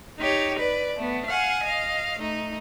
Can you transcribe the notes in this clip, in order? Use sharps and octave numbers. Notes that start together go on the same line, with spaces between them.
D#4 G4 C#5
B4 D5
A3 B3
F5 F#5 G#5
D#5 F5
A3 D#4